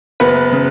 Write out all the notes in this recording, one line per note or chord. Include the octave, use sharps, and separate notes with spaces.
F#1 B3 B4
C#3